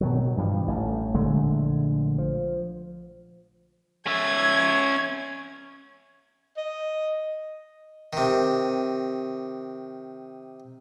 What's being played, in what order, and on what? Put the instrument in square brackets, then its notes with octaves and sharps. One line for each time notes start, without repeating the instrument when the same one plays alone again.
[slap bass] B2 D#3 F#3
G2 E3 F3
A1 A2
A#1 D3 G#3 A3
F3
[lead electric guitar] C#4 E5 [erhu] G#6
[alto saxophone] D#5
[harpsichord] C3 D#3